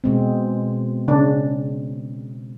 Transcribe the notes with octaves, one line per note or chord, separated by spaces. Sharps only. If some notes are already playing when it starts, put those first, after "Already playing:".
B2 G#3 C4
C#3 D4